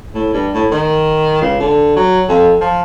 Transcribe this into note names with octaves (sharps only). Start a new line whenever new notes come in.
A2
G2
A2
D#3
C#2
D3
F#3
F2
F3